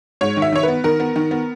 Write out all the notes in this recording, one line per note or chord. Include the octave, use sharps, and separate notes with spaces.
G#2 C#5
D#3
E5
D#3 C#5
B3 B4
D#3 A#4
B3
D#3
B3